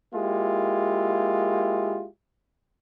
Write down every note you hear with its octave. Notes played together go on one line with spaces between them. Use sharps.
G#3 A#3 E4 F4 G4